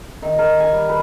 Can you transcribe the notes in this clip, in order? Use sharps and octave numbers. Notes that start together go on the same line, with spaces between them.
D#3
A#4
G#5
G3
B4